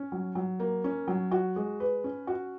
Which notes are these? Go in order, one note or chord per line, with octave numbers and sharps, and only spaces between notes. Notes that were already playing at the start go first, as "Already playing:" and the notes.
Already playing: C#4
F#3
F#3
A#3
C#4
F#3
F#4
G#3
B4
C#4
F#4